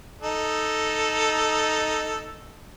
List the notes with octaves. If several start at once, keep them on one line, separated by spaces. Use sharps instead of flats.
D#4 A4